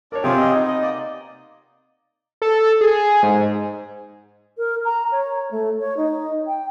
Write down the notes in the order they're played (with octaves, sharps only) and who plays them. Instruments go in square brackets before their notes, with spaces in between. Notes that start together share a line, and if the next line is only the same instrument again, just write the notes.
[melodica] D4 D5 [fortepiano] A#4 C#5
[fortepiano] C3 [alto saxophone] F3 [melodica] F4 G#4 [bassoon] G4
[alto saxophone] D#5
[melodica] B3 [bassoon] D#4
[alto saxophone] D#5
[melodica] A#3 D5
[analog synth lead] A4
G#4
G#2
[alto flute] A#4
A#5
C#5
A3
C#5
D#4
G5